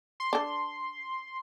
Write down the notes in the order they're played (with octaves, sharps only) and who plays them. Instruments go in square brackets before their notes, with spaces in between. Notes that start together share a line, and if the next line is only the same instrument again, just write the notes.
[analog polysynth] C6
[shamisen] D4 A4